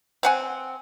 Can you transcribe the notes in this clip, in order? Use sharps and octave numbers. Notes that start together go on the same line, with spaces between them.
C4 F#5 G#5